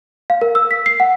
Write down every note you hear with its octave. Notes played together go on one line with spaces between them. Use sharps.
F5
A#4
E6
B6
C7
F#5